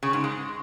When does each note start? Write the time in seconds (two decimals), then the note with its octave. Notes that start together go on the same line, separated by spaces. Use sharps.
0.03 C#3
0.13 G#2
0.24 G#3